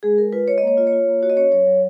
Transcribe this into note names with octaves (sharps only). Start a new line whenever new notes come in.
G#3 G#4
G#3 A#4
F4 B4
G#3 C#5
D#5
A#3 C#5
F4 D#5
C#5
F4
A#3
F#4 C#5
D#5
C#4 C#5
F#3 C#5
F#3